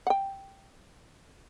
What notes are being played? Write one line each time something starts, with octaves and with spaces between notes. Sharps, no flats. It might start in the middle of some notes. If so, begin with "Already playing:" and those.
F#5 G5